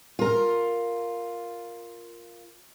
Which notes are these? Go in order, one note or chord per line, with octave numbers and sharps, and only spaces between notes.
F4 A#4